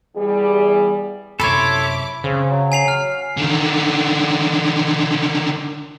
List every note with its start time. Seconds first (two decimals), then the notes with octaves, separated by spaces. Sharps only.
0.15 E2 G3 G#4
1.40 F#2 C3 E4 A4 C#5 B5 C6 D6
2.24 C#3 C4
2.51 F#3
2.72 G#5 C7 F7
2.88 F6
3.37 D3 D#3